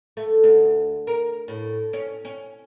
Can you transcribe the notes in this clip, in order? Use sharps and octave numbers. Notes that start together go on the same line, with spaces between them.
A3
D2
A#4
A2
C#4
C#4